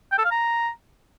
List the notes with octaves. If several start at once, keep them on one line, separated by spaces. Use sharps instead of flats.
G5
A4
F5
A#5